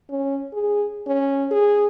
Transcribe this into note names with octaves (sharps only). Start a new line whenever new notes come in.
C#4
G#4
C#4
G#4